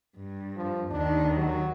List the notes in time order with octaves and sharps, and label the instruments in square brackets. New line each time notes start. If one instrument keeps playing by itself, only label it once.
[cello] G2
[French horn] F3
[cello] D#2 D#3 [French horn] D4
[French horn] F#3